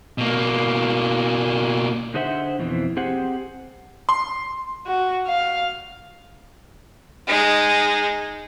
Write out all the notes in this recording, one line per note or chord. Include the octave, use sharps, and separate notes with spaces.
B2 A#3
D3 D#4 G#4 C5 E5 F#5
F2 B2 E3 C4
C4 G4 G#4 C5 F#5
C6
F#4
F5
G#3 D#4